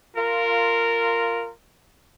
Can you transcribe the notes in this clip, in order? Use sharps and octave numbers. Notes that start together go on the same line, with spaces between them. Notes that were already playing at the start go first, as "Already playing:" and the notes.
F4 A#4